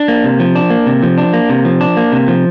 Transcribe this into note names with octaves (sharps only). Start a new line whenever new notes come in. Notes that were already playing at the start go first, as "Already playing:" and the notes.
Already playing: D4
A#3
C3
F3
D4
A#3
C3
F3
D4
A#3
C3
F3
D4
A#3
C3
F3